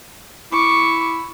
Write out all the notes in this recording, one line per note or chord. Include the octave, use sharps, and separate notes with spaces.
E4 C#6 D6